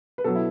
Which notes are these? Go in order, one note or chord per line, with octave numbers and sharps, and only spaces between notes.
B4
B2 F#3 A4
E4